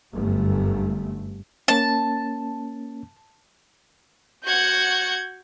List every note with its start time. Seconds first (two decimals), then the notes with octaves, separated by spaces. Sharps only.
0.13 G1 F#2 A3
1.68 A#3 C#4 A5
4.44 F#4 F#5 G6 G#6